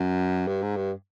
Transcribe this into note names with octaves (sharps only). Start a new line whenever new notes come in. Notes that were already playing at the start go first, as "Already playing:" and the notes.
Already playing: F#2
G2
G#2
G2